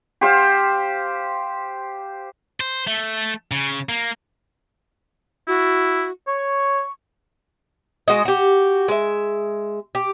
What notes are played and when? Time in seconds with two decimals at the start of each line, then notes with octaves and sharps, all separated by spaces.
0.21 G4 C5 F5
2.60 C5
2.87 A3
3.52 C#3
3.89 A#3
5.48 E4 F#4
6.28 C#5 C#6
8.08 G#3 F#4 D#5
8.25 F#4 G4
8.88 G#3 E5
9.95 G4